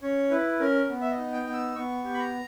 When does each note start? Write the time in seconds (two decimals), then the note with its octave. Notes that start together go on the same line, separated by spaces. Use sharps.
0.02 C#4 C#5
0.31 E4 B4
0.60 C#4 A#4
0.89 B3
1.01 E5
1.11 D#5
1.18 D#4
1.32 G5
1.47 B3
1.53 E6
1.76 B3 C#6
2.04 G4
2.14 B5
2.19 A#5